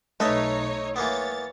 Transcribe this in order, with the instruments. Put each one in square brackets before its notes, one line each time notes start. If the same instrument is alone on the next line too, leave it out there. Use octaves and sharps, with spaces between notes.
[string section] B1 D#4 C#5 [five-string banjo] A3 [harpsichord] B4 D#5 A5
[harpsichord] E3 A#3 B3 [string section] C#5 A6